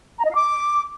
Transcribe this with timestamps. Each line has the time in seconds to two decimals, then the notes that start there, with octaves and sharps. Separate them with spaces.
0.18 A#5
0.24 D#5
0.30 F5
0.35 D6